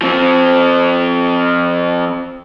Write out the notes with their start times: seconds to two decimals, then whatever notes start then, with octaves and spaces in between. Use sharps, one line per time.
0.02 F3 C4